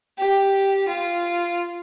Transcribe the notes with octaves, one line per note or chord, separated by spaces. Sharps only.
G4
F4